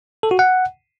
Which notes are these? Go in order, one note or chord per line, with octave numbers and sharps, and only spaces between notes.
A4
F#4
F#5